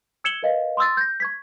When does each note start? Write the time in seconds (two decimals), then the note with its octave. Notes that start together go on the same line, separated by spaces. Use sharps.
0.24 E6 G#6 C#7 E7 F#7 G7
0.43 A#4 B4 D#5 F5
0.77 C6 D#6 E6 A6
0.97 G6 A#6
1.20 C#6 G#6 B6